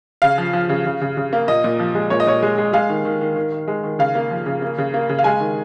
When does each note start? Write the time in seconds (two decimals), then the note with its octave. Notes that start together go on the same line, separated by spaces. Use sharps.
0.22 C#3 F5
0.38 F3
0.53 F3
0.69 C#3
0.86 C#3
1.01 C#3
1.17 C#3
1.33 A#3
1.48 A#2 D#5
1.64 A#2
1.80 F3
1.95 G#3
2.10 A#2 C#5
2.20 D#5
2.27 A#2 C#5
2.42 G#3
2.58 G#3
2.73 G#3 F5
2.89 D#3
3.05 D#3
3.21 D#3
3.36 D#3
3.52 D#3
3.68 G#3
3.84 D#3
3.99 C#3 F5
4.15 A#3
4.31 F3
4.46 C#3
4.62 A#3
4.78 C#3
4.94 A#3
5.09 C#3
5.19 F5
5.24 G#3 G#5
5.40 D#3